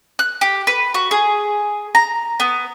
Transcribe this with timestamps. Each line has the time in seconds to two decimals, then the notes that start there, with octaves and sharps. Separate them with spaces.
0.19 F#6
0.41 G4
0.67 B4
0.94 F#4
1.11 G#4
1.95 A#5
2.40 B3